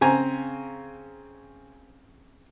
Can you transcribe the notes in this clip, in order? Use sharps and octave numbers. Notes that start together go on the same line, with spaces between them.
C#3 C4 G#5 A#5